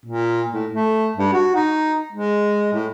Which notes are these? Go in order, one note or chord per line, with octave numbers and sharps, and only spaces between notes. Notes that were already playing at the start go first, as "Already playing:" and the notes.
A#2
A2
A3
G2
F#4
D#4
G#3
A2